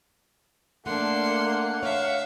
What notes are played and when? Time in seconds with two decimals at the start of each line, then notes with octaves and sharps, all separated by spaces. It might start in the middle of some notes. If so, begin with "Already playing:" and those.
0.86 A3 A#3 D4 F#5 C6
1.83 C#5 E5 F5